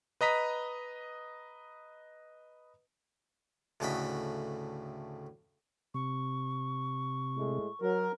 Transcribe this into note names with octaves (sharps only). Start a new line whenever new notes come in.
B4 D#5 A#5 B6
D2 A2 C#3 D#5 F#5 B5
C3 C#6
A2 G#3 A3
F#3 A#4